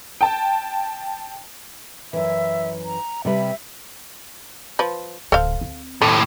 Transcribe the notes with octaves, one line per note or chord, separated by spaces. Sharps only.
G5 A5
F#2 E3 E5
A#5
C3 G3 B4 E5
F3 B4
D1 A4 C5 F5
C4
D#2 A2 A4